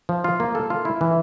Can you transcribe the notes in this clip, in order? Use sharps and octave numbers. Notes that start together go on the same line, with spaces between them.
F3
F4
A#3
A4
F4
E4
E3